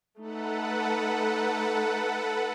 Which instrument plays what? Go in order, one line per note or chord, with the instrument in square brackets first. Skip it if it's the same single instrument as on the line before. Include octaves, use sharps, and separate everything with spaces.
[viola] A3 D#4 [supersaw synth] A4 B4 F#5